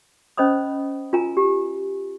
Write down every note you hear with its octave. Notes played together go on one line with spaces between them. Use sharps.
C#4 C5 D#5 B5 D#6
F4 A#4 G#5 A#5
G4